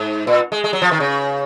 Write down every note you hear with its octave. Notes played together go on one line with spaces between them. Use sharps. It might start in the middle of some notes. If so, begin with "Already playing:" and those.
Already playing: G#2
A#2
G#3
G#3
F#3
F3
D#3
C#3